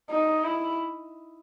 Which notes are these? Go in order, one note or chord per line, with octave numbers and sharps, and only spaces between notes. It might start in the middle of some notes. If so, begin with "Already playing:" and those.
D#4
E4